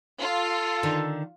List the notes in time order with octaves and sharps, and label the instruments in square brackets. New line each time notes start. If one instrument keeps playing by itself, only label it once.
[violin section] F4 [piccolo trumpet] A4
[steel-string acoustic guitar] D3 D#3